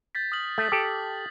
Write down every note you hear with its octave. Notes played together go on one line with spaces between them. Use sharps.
G6 A6 B6
D#6 F6 F#7
A3 D#6 B6
G4 A4